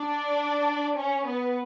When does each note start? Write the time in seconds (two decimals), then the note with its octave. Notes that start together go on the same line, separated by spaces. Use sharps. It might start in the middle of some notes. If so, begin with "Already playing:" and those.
Already playing: D4 D5
0.98 C#4 C#5
1.27 B3 B4